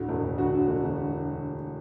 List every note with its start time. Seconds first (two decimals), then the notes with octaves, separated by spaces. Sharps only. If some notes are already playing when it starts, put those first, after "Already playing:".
Already playing: D2 A2 D3 F#4
0.09 E1
0.23 E1
0.38 D2 F#4
0.53 D3
0.68 E1
0.84 E1